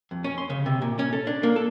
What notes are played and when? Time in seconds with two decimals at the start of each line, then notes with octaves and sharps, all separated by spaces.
0.11 F2
0.24 C#4
0.38 C6
0.50 C#3
0.66 C3
0.82 A#2
0.99 C#4
1.13 A4
1.27 D4
1.43 A#3
1.56 A4